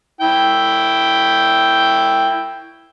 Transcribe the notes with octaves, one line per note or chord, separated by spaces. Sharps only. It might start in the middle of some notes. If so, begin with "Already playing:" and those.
E4 G5